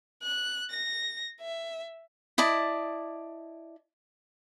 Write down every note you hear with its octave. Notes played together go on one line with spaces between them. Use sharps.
F#6
A#6
E5
E4 D5 D#5 A5